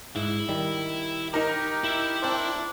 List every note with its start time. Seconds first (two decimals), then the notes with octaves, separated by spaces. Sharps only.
0.16 G#2 E4 E5
0.48 D#3 G3
1.34 D#4 G4 A#4
1.84 E4
2.22 C4 D4 C5